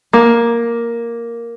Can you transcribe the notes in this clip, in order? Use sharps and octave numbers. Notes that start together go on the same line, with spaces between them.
A#3